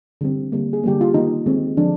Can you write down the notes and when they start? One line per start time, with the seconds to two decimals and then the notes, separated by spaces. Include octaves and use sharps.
0.21 D3 G3 C4
0.52 D3 G3 A#3
0.73 G#4
0.83 D3 G3 A#3 G4
1.01 F4
1.14 D#3 A#3 D#4
1.46 D#3 G#3 C4
1.77 D3 F3 G#3 D4